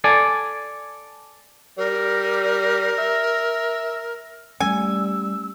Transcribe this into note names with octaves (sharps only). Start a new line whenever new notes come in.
A4 D5 G#5
G3 A#4
E5
G3 A3 A#3 C#4 G#5 E6